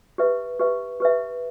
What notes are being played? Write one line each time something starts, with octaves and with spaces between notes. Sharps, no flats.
G4 B4 E5
G4 B4 E5
G4 B4 E5